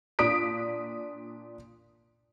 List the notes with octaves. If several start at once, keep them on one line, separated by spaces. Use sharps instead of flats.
A#2 D4 D#6 B6 D7